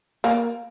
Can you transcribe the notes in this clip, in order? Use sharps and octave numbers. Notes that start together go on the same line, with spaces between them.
A#3